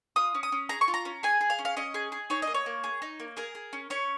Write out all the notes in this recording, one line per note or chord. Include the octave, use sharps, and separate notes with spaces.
F4 D#6
C#4
D#6
C#4
G#4 A#5
C#6
F4
A#5
C#4
G#4 G#5
G#4
F5
C#4
F5
C#4 D#5
G#4
G#4
D#4 C#5
D#5
A#3
C#5
A#3
G#4
D#4
A#3
G#4 A#4
G#4
C#4
C#4 C#5